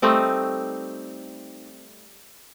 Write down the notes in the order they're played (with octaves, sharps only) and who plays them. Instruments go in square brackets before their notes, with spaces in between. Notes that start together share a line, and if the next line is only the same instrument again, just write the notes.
[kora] G3 A3 C4 D#4